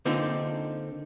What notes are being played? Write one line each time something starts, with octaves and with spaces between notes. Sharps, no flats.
D3 A#3 C4 D#4 F4